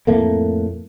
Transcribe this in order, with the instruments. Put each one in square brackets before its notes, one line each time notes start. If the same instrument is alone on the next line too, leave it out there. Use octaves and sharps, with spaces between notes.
[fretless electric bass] F2 A2 A3 A#3